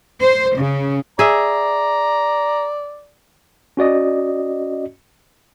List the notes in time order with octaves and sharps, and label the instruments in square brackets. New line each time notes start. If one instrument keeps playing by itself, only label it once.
[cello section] C5
C#3
[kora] G#4 E5 [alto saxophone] D5 [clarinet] A#5
[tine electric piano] C#4 F#4 D5 D#5